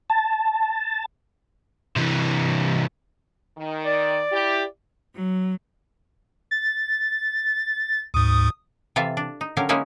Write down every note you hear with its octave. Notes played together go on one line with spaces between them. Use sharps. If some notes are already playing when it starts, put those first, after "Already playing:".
A5
C3 E3
D#3
D5
E4 G4
F#3
A6
D2 G#2 D#6
C3 E3 F4 A4 E5 F5
D4
D#4
D3 F#3 C#4 G4 A#4 F5
G#3 A#3 C#4 D#4 E4 E5